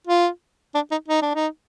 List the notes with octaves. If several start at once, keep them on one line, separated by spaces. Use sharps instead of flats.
F4
D4
D#4
D#4
D4
D#4